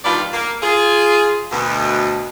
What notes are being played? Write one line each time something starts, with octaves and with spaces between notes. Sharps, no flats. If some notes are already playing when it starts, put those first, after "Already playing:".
G2 B2 D#3 F4 B4 D5
A#3
F4 G#4
D2 B2